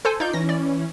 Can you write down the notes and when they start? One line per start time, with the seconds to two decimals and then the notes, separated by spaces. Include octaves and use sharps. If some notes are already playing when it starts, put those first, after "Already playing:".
0.05 A4 C5 G#5
0.20 D#4 F4 D5 G6
0.33 E3 C#4 A#6
0.49 D5